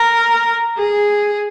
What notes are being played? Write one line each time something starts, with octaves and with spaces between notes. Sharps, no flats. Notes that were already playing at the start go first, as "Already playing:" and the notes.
Already playing: A#4
G#4